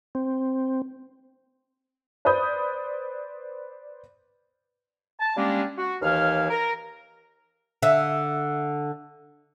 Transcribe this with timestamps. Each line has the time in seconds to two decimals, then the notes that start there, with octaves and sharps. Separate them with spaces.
0.15 C4
2.25 B4 C5 D5 B5 D#6 G6
5.19 A5
5.36 G3 G#3 A#3 C#4 D4
5.77 F#4
6.02 D#2 E3 C#5 F5 F6
6.50 A#4
7.82 D3 E5